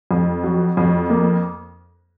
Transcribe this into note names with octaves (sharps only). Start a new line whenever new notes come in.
F2
F#3
F2
A#3